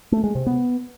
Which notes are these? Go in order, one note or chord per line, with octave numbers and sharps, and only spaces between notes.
A3
G#3
C3
B3